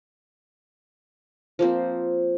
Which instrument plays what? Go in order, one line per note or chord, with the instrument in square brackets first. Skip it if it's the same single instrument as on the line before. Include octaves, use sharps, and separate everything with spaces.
[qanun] F3 A#3 C4